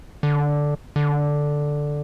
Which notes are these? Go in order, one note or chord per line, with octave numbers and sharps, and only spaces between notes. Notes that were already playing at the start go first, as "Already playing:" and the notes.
D3
D3